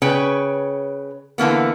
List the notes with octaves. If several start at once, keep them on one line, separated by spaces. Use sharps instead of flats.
C#3 B4 C#5 G5
D3 E3 A#3 B3